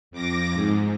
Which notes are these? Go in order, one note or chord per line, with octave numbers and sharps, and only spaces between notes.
F2 D6 A#6
G#2